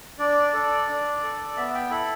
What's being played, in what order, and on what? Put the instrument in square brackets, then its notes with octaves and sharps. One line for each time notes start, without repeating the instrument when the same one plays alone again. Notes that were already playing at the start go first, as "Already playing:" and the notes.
[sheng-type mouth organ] D4 D5
A4
D4
A4
B3 E5
G5
E4 A4 B5